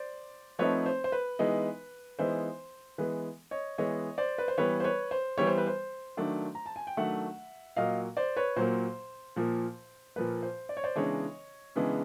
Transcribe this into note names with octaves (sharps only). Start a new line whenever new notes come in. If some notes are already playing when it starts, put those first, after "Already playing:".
Already playing: C5 D5
F3 A3 C4 D#4 B4 C#5
C5
C5
B4
E3 G#3 B3 D#4
E3 G#3 B3 D#4 C5
E3 G#3 B3 B4
C#5 D#5
E3 G#3 B3 C#5 D#5
C5 D5
B4
C5
E3 G3 B3 B4 C#5
C5
B4 C#5
C5
E3 G3 B3 C#5
C5
B4
C5
D#3 F#3 A3 D4
A#5
A5
G#5
G5
D#3 F#3 A3 D4 E5 F#5
A#2 F#3 A#3 D#5 F5
C5 D5
B4 C#5
A#2 F#3 A#3 C5
A#2 F3 A#3
A#2 F3 A#3 B4
C5
D5
C#5
C5 D5
C#3 E3 G#3 B3 D4 C#5 D#5
C#3 E3 G#3 B3 D4